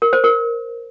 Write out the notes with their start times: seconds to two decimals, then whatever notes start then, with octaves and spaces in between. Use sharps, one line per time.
0.02 A#4
0.13 C5
0.24 A#4